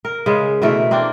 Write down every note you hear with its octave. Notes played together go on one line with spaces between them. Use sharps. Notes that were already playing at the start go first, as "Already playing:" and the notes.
A#4
C#3 G#3
B2 E3 A3 A#4
A#3 C4 D4